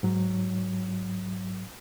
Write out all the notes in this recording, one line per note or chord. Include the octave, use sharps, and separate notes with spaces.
G#2 F#3